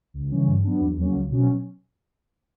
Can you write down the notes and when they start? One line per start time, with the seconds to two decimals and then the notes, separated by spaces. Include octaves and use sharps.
0.14 C#2
0.32 C#3 E3 G3 C#4
0.48 G2
0.64 F#3 B3 D4
0.81 E2
0.98 C#3 F#3 A#3 C#4
1.15 C#2
1.30 B2 F#3 C#4